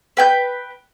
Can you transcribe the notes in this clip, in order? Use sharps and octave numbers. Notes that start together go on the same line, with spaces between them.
B4 G5 G6